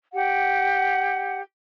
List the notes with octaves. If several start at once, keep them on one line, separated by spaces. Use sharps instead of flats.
G4 F#5